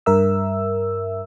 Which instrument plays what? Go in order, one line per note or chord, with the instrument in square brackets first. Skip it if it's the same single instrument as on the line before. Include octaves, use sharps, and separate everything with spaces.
[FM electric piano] G2 A#4 E5 E6